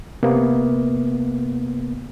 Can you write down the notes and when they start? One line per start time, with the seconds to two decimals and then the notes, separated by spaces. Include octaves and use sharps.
0.23 C3 A#3 B3